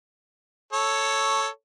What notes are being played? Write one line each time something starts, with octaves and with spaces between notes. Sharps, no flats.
A4 C#5